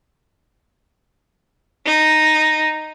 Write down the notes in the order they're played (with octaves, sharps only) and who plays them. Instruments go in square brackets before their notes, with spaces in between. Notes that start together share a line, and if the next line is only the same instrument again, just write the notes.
[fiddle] D#4